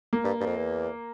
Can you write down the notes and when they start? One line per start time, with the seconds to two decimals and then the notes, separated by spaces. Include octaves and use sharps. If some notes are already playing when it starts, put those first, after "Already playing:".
0.13 A#3
0.24 G2
0.41 G2
0.46 F2
0.57 E2